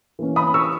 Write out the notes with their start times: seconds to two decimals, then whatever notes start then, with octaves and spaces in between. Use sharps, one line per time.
0.19 E3 A#3 C#4
0.36 B5 D#6
0.54 C#6 E6